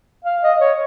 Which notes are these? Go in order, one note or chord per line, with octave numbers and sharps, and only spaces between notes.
F5
D#5
C#5